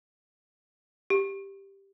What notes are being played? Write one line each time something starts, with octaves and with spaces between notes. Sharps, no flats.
G4